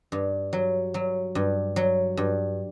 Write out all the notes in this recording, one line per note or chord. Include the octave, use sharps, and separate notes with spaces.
G2
F#3
F#3
G2
F#3
G2